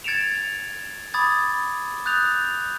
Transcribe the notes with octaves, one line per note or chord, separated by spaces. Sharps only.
G#6 A6 C#7 D7 E7 F7
B5 D6 D#6 G#6 A6
D#6 F#6 G6 A6 F7